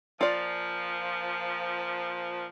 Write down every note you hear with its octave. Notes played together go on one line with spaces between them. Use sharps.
A#2 F3 F4 D5